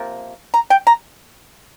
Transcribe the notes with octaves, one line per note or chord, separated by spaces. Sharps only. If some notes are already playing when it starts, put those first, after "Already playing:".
Already playing: C3 F3 A#3
A#5
G5
A#5